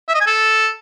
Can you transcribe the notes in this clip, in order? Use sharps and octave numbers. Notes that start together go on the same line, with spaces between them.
E5
D#5
G#5
A4